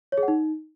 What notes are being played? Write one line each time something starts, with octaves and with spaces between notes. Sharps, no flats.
C#5
G#4
F#5
D#4